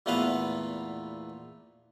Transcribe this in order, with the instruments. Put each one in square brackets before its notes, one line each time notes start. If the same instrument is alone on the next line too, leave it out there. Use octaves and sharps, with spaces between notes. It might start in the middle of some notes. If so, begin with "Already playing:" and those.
[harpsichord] E2 A#2 A3 B3 B4 F5